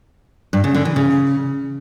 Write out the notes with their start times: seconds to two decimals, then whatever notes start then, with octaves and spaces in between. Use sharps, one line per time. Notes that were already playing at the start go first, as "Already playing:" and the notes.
0.53 G2
0.64 C#3
0.75 D3
0.85 E3
0.96 C#3